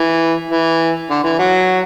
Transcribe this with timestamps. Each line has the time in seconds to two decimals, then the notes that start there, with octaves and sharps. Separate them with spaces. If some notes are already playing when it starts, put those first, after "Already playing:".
Already playing: E3
0.51 E3
1.10 D3
1.24 E3
1.39 F#3